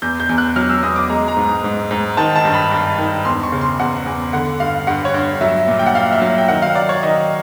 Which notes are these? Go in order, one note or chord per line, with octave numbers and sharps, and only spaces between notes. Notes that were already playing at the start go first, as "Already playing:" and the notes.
E2 G6
G6
E2
F#6
F#3 F6
E6
E2 D#6
D6
G#3 A#5
A#5
G#2
G#2
G#2
D#3 A5
A5
G2
B5
G2
D#3
E2 C6
C#6
C#3
C6
E2 F#5
E2
D3 F#5
G2 F5
G2 F#5
C#5
G2
F#3 E5
A#2
G5
F#5
A#2 F5
E5
F#3
G5
D#3 F#5
F5
F#3 D5
C#5
D#3 D#5